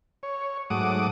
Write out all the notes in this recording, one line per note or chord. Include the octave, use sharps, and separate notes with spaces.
C#5
G#2 F#3 A3 F#5 D6 D#6